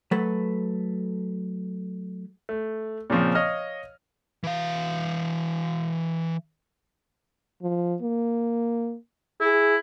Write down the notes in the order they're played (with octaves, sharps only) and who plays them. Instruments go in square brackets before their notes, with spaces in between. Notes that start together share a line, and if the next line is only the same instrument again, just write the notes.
[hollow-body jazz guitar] F#3 A3 A4 B4
[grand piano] A3
A#2 C#3 F3 C4
C#5 D#5 F5 F6
[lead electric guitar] E3 F5
[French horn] F3
A#3
[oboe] E4 [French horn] G#4